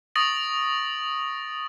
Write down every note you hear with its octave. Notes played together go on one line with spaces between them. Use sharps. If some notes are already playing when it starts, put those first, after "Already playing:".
C#6 D#6 A6 A#6 D7 F#7